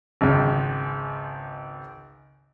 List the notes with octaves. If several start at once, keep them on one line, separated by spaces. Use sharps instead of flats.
G#1 C#2